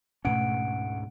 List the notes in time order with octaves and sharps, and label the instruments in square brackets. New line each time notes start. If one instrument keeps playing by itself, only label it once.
[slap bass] D2 G#2 C#4 [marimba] B2 A3 [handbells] F#5 D7